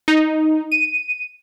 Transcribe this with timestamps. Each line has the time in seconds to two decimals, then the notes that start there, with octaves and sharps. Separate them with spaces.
0.08 D#4
0.72 D#7